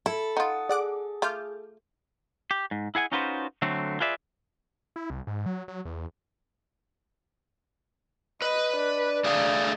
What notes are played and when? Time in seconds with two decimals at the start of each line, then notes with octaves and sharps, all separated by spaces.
0.06 E4 A4 B5
0.37 D#4 F4 F#5 D#6
0.69 G#4 D5 F#5 D6
1.22 A3 F4 D6 F6 G6
2.51 G4
2.71 G#2
2.95 E4 G#4 F#5 G#5
3.12 C#4 D#4 F4 F#4 B4 C5
3.62 D3 F#3 A3 C4
4.00 F4 G#4 B4 D5 E5
4.96 E4
5.10 C2
5.27 G#2
5.46 F#3
5.68 F#3
5.85 E2
8.42 B4 D#5
8.77 D4
9.24 A3 G#4 F5